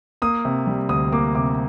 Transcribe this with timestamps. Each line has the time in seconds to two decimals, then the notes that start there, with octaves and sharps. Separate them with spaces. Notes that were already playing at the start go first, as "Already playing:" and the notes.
0.22 A#3 D#6
0.45 C3
0.67 G3
0.89 D2 D#6
1.12 A#3 D6
1.35 C3 D6